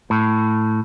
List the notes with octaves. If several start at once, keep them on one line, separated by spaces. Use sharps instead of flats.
A2